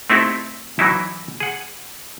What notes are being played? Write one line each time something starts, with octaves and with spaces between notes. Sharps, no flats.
A3 C4 D#4 E4 G4 A4
E3 F#3 D#4 E4
G#4 F#5